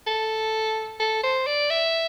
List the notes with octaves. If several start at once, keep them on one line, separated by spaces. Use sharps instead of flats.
A4
A4
C5
D5
E5